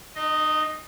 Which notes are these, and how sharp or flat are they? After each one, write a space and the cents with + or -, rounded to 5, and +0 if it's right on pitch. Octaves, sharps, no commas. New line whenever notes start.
D#4 -35 D#5 +0